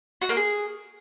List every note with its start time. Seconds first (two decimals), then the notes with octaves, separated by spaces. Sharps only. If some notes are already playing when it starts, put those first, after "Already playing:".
0.22 F#4
0.29 A#3
0.37 G#4